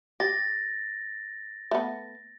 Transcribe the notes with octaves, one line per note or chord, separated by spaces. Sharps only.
G4 A6 A#6
A3 B3